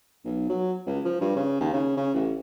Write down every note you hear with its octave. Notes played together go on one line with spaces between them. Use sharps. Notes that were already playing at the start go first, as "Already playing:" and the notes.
B1
F#3
C#2
F3
G2
C#3
D#2
C#3
C#3
A1